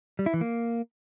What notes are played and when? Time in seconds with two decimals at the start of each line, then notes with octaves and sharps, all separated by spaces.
0.19 G3
0.26 E4
0.34 E3
0.41 A#3